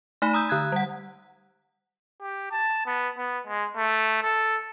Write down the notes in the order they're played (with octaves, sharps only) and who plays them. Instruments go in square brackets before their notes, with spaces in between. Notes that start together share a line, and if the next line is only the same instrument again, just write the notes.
[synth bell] A3 D#4 B5
A#5 D#6 E6 G6
D3 F#6 G#6
G3 F#5
[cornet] G4
A5
B3
B3
G#3
A3
A4